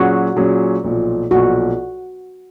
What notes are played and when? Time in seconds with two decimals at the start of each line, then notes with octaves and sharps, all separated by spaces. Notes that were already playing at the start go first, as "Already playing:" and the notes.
Already playing: A#2 F#3 C#4 F#4 G#4
0.36 A#2 F#3 C#4 G#4
0.84 B1 A#2 F3
1.31 B1 A#2 F3 F#4